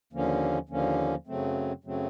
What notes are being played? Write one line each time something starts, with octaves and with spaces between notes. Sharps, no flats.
D#2 D3 F3 A#3 C#4
D#2 D3 F3 A#3 C#4
F#2 C#3 F#3 A3 C4
F#2 C#3 F#3 A3 C4